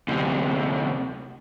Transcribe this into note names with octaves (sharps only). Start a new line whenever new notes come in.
D2 C3